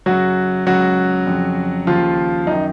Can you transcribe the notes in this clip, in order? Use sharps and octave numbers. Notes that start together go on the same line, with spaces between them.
F#2 C#3 F#3 F#4
C#2 C#3 F#3 F#4
F2 C#3
D#2 C#3 F3 F4
F#2 D#3 D#4